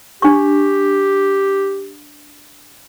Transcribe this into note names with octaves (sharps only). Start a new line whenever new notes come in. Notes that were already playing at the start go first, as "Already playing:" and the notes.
D4 G4 C#6